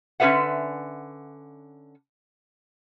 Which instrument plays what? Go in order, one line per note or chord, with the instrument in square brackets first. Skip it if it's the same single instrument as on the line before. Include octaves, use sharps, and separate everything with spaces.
[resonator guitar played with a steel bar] D3 C#4 G#4 B4 E5 F#5